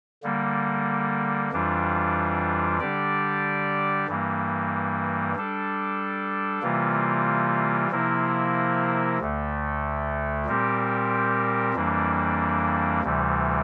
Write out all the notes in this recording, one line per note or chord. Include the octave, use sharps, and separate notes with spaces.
D3 G3 A#3
F2 E3 G3 D4 F4
D3 G3 D4 G4 D5
G2 E3 G3 A#3
G3 D4 A4
C3 E3 G3 A#3 F4
C3 F3 A#3 E4 A#4
D2 D3 A3
A#2 G3 C4 G4 A#4
F2 E3 G3 A#3 D4
D2 C3 E3 G3